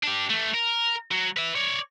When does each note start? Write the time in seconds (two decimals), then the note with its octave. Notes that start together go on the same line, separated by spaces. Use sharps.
0.03 D4 G4
0.30 E3 A3
0.54 A#4
1.11 F#3
1.37 B4 E5
1.56 C#5 D5